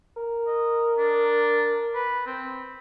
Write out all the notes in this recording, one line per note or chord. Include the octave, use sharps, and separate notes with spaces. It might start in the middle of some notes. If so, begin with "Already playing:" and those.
A#4
D#5
D4
B4
C4